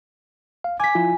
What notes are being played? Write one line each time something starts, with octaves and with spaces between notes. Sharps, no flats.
F5
G#5 D6 B6
F3 E4 F4